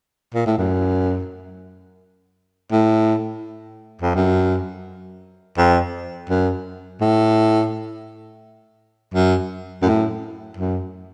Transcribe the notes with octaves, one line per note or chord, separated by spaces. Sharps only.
A#2
A2
F#2
A2
F2
F#2
F2
F#2
A2
F#2
F#2
A2
F#2